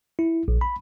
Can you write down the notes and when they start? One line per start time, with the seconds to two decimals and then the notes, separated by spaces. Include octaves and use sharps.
0.19 E4
0.48 A#1
0.61 B5